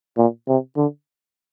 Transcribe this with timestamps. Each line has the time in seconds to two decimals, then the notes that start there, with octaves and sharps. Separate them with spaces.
0.18 A#2
0.48 C3
0.77 D3